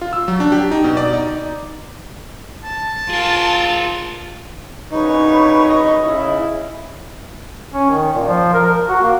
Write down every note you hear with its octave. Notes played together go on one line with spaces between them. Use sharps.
F4
E6
F#3
D4
G4
D#4
B2
D5
D#4
A5
F4 G#4 A#4
C2 F#2 C#3 D#4 B4 C#5 C#6
D#5
C#3 E4
C#4
D#3
A#2
F3
A#4
A#4
F#4
A#3